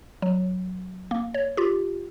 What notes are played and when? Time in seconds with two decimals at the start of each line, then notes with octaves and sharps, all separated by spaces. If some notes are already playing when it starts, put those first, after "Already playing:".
0.22 F#3
1.11 A#3
1.34 C#5
1.57 F4 G4